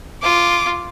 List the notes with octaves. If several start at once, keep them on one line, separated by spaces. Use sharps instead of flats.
F4 D6